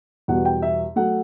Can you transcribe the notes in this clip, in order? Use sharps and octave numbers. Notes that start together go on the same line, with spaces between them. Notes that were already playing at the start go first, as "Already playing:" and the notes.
E2 B2 G3 F#5
G5
E5
F#3 A3 F#5